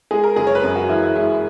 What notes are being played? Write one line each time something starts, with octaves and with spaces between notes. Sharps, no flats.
G#3 G#4
A#4
F#1 G#4
C#5
B4
F#2 A#4
F#4
E3 E4
E4
G#3 E4